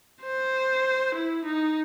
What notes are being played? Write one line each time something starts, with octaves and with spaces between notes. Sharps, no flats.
C5
E4
D#4